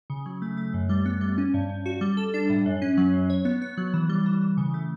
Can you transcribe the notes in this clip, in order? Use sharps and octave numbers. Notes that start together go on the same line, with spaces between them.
C#3
F#3
A3
A3
F#2
G3
B3
G3
C#4
G2
G2
F#4
G3
A4
D4
A2
F#2
C#4
F#3
F#2
C#5
B3
B3
F#3
E3
G3
E3
E3
C#3
A3